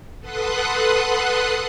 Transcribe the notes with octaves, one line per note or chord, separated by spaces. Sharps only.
A4 B4 F#5 C6 D#6 F#6